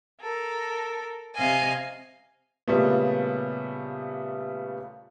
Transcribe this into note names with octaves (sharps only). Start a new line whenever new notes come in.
A4 A#4
C3 D#5 F5 G#5
A#2 C#3 G3 A3 B3